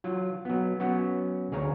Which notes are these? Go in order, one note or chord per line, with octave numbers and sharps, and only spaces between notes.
F#3 F4
F#3 B3
F#3 B3 C#4 F#4
D2 G#4 C#5 F5 A#5